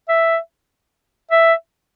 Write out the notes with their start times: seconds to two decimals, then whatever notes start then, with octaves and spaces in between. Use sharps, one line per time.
0.08 E5
1.31 E5